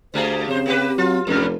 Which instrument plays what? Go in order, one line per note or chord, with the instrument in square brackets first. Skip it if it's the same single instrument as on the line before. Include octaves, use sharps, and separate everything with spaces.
[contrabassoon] D2 [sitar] G3 A3 G#4 [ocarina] C5
[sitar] F2 C5 [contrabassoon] C#3 [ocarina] C4
[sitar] A#3 G4 B4
[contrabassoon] F#3 [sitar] F4
[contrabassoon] F1 [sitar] F2 G#2 G3